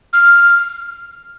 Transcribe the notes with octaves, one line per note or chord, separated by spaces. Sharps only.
F6